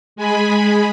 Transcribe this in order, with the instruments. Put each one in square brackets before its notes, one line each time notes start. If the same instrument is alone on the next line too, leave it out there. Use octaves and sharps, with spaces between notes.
[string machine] G#3 G#4 B5